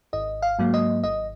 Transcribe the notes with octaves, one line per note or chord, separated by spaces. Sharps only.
G#1 D#5
F5
G#2 F#3 A#3
D#5
G#1 D#5